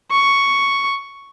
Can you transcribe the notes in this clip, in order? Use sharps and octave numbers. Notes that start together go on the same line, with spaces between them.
C#6